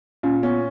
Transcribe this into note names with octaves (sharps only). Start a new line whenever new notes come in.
A#2 C#4
B3 C#4